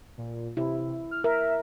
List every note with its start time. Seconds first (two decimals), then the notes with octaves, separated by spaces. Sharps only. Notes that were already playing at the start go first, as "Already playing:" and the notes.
0.18 A#2
0.57 C3 E4
1.11 F6
1.24 A#4 E5